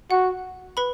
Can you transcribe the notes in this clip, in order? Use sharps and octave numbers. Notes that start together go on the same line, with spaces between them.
F#4 F#5
B4 B5